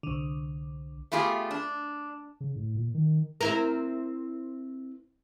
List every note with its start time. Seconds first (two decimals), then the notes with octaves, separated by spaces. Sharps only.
0.03 C2 D3
1.12 A3 B3 F4 G4 G#4
1.51 D4
2.40 C#3
2.56 A2
2.76 A#2
2.94 D#3
3.41 C4 E4 A#4